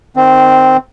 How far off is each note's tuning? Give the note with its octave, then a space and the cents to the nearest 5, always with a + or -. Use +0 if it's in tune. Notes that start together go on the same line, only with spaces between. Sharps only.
D#3 -15 C4 -10